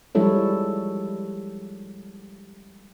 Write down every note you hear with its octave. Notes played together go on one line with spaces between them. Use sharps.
F3 G3 G#3 E4 A4 C#5